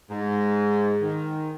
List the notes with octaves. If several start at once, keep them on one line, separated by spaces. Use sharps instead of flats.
G#2
D#3